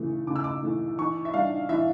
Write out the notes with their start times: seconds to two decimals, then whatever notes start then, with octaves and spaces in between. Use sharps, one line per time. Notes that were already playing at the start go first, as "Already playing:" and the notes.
Already playing: C#3 E3 A3
0.27 C#3 D6
0.36 E6
0.44 D6
0.63 E3 A3
0.98 E3 C#6
1.25 E5
1.34 G3 D4 F5
1.69 E3 E5